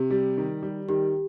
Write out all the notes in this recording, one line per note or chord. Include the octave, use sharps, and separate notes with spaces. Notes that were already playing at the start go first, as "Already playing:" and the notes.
Already playing: C3 G4
G3
D#3
G3
D#3 G4